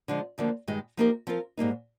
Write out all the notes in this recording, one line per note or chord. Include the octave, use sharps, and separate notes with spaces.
D3 F3 G#3
D2 D3 F3 A#3
G2 D#3 G#3
F3 A#3 D#4 G4 A#4
F3 C4 F4 A#4
G#2 G3 A#3 D#4